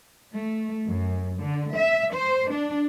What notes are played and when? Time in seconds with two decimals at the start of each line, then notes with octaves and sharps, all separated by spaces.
0.34 A3
0.86 F#2
1.40 D3
1.74 E5
2.14 C5
2.51 D4